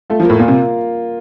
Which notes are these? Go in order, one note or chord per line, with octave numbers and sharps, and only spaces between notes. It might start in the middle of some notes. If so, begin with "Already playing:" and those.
A3 F4
F3
A2 A#3
A#2 F4
C3